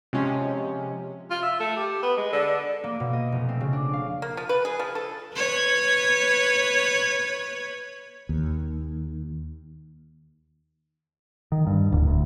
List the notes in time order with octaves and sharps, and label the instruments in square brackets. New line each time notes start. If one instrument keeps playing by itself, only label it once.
[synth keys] C3 F3 G#3 C#4
[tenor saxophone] F4
E5
A3
G4
B3
G#3
D3
[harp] A#3
B2
D#5
F1
C4
C#3
D4
F5
[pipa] A#3
F3
B4
G#4
F3
A4
[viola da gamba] B4 C#5
[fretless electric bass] D#2
[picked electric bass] D#3
G2
D1
D2